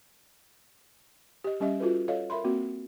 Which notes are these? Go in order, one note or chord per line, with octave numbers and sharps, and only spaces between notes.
G4 D#5
G3 C#4 G4 D#5 E5
F4 F#4 A4 B4
A4 C#5 D#5 F5
A#4 E5 B5 C6
A#3 C4 F#4